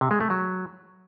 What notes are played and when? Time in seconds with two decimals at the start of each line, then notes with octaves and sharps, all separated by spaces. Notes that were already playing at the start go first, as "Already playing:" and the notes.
0.01 C3
0.11 G#3
0.20 A3
0.30 F#3